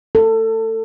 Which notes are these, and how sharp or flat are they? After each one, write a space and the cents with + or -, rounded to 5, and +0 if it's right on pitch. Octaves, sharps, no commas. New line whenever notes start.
A4 +25